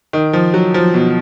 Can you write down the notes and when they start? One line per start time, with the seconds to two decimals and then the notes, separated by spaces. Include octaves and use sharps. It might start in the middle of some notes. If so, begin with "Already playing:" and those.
0.13 D#3
0.33 F3
0.54 F#3
0.74 F3
0.94 B2